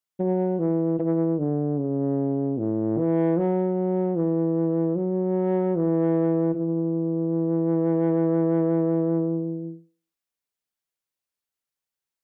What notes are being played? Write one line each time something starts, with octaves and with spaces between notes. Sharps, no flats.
F#3
E3
E3
D3
C#3
A2
E3
F#3
E3
F#3
E3
E3